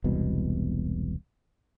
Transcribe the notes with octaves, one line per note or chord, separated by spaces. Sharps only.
E1 C2 B2